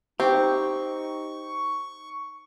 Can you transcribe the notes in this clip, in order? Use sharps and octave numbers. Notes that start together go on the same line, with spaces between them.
C4 D#4 G4 C#6